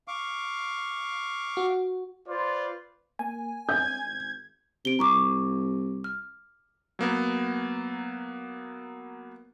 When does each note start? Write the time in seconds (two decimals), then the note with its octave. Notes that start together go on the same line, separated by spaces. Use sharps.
0.08 F5 C#6 D6
1.57 F#4
2.28 F4 B4 C5 D5
3.19 A#3 G#5
3.69 C4 G6 G#6
4.06 G#1
4.85 C3 D7 G7
4.99 C2 A#5 C#6 D6
6.04 F6
6.99 F#3 A#3 B3